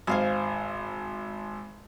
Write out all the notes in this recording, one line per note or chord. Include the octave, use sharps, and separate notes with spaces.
G#1 C5 F5 G#5